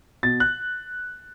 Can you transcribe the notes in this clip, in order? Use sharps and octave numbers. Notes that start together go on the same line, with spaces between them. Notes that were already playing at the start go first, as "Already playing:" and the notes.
B2 A6
F#6